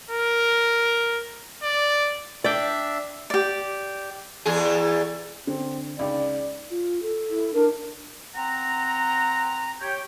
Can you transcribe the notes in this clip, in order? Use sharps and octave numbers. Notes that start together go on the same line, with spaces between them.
A#4
D5
D4 D5 E5 G5
G4 D5
E2 G#4
D3 C4
C#2 D#4 D5 G5
F4
A4
E4
D4 A#4
C4 F#5 A#5
G4 C#5 G5